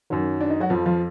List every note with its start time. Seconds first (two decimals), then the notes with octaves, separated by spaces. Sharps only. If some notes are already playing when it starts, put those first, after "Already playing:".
0.10 F#2 D#3 F#3
0.41 D4
0.50 D#4
0.60 F#3 F#4
0.70 F2 F3 F4
0.86 F3 F4